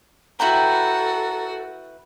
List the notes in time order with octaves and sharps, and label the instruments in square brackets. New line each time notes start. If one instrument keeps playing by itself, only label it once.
[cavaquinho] E4 B4 G5 [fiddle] F#4 [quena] A4 [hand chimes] A#5